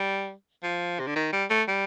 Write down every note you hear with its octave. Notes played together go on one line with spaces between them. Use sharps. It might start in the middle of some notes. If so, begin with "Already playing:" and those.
Already playing: G3
F3
C3
D3
D#3
G3
A3
G3